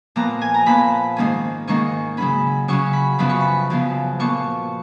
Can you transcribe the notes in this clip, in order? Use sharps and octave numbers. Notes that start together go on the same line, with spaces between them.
A#2 F3 B3 A#5
G#5
A#5
A#2 F3 B3 B5
G#2 D#3 A#3 C#4
G#2 D#3 A#3 C#4 C#6
C#3 F#3 C#4 B5
C#3 F#3 C#4 C#6
B5
F#2 C#3 F3 B3 B5
C#6
B5
F#2 C#3 F3 B3
A#2 F3 B3 C#6